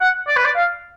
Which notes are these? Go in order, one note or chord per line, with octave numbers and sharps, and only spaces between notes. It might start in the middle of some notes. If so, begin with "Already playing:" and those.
F#5
D5
B4
D5
F5